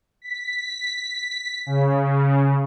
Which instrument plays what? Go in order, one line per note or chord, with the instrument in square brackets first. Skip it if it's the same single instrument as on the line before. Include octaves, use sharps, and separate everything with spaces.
[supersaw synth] B6
C#3